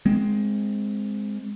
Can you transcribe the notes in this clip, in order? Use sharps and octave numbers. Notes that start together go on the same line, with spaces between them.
G#3 C4